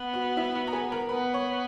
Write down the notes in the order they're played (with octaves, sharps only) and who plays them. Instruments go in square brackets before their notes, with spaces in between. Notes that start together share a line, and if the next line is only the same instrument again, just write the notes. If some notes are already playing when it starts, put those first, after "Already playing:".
Already playing: [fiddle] B3
[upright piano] F#4
E4 E5
F#4 F#5
A#5
G#4 G#5
A#4 A#5
[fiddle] B3 [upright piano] B4 B5
[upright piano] C#5 C#6